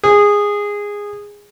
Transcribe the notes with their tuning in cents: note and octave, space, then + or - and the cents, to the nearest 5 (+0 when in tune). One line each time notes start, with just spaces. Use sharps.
G#4 -15